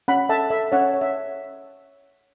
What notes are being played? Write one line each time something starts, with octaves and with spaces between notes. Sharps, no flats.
C#4 F#5 B5
A4 E5 A5
A4 E5
C#4 C#5 F#5
C#5
E5